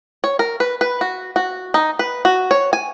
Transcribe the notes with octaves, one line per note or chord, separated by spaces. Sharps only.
C#5
A#4
B4
B4
F#4
F#4
D#4
B4
F#4
C#5
G#5